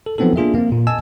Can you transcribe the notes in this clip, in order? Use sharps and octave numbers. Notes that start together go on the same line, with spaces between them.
A4
F3 F#3 B3 C4 D#4 A4
A#3 D4 F4 G#4 A#4 E5
A#3 C4
A#2
D#5 G#5 A5 E6